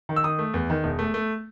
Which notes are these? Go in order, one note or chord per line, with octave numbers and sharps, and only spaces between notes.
D#3
E6
D#3 D#6
A3
E2
D#3
E1
A3
A3